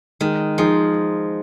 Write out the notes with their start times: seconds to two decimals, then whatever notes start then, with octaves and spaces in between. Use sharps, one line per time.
0.21 D#3 G#3
0.58 F3 D#4 G#4